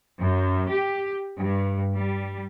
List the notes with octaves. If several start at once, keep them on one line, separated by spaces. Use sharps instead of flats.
F#2
G4
G2
G3